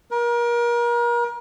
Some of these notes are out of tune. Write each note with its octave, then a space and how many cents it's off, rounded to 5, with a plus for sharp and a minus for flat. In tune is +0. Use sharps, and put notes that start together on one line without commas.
A#4 +35